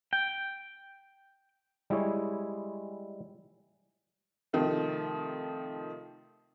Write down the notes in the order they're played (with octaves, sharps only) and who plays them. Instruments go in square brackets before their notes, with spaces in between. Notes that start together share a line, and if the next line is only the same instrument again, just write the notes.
[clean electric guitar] G5
[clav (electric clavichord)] G3 G#3 E4 G#4 C#5
[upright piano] C3 D#3 F3 A3